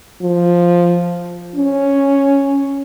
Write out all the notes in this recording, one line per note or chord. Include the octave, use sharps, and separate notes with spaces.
F3
C#4